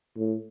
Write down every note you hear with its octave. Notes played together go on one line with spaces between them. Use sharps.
A2